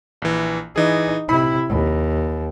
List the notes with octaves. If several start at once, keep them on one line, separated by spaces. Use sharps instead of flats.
A#1 E3
E3 D#4 G#4
C3 E4 B5
D#2